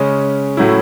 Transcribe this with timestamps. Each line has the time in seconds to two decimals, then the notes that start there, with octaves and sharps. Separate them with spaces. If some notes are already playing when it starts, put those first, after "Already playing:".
Already playing: C#3 G#3 C#4
0.57 A2 F#3 A3 C#4 E4